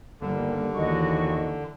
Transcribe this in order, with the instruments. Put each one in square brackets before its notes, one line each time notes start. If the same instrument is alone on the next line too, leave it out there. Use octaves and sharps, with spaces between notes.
[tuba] G1 [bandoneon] D3 [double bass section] D#3 G3 A#3
[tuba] D#2 [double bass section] D#3 E3 [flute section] F#4 D#5 C#6